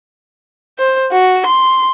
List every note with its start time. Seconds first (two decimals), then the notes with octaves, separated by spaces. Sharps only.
0.78 C5
1.12 F#4
1.46 C6